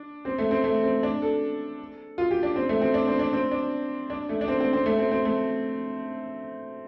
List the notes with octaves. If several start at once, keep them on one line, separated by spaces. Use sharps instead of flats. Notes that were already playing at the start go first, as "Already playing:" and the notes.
Already playing: D4
C4
A3
C4
A3
C4
D4
A4
F4
G4
D4
C4
A3
C4
D4
C4
D4
C4
D4
D4
A3
D4
C4
C4
C4
A3
C4
C4
A3